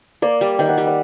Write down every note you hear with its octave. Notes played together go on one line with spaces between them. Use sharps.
A#3 D5
G3
D#3 G5
F#5
G3
F#5